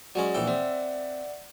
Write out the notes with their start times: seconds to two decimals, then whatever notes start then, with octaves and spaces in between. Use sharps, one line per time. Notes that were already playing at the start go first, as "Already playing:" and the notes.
0.15 F#3 G#3 C#4 G#4 D5
0.35 A#1 E3 F#5 G5 E6
0.47 C4 D5 E5 F#5